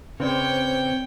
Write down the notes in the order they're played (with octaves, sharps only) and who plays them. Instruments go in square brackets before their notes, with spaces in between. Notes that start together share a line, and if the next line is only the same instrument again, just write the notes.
[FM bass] C#3 [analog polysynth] C4 [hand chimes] B4 D5 G6 [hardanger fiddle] C#5 G5